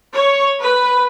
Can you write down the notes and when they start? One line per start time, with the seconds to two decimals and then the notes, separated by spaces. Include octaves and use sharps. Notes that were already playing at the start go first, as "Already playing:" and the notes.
0.13 C#5
0.60 B4